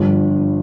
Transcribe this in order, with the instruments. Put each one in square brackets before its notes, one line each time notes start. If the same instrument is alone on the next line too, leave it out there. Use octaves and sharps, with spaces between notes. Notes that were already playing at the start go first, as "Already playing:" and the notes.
Already playing: [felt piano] G1 G2 F3